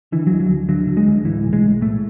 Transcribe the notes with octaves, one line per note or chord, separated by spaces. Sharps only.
D3 E3
F#3
D2
F#3
D2
D3 F#3
D3
G#3
D2
A2 E3
B1
G#3
B1
A2 A3